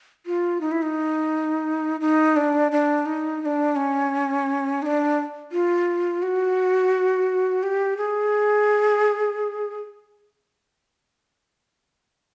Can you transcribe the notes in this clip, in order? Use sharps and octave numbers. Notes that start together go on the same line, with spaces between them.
F4
D#4
E4
D#4
D#4
D4
D4
D#4
D#4
D4
C#4
D#4
D4
F4
F#4
G4
G#4